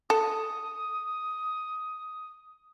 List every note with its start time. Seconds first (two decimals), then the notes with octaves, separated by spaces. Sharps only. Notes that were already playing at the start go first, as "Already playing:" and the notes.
0.10 A4 D#6